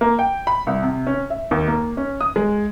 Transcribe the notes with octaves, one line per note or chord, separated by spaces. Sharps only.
A#3
G5
B5
C2
C3
C#4
E5
D#2
A#3
C#4
D#6
G#3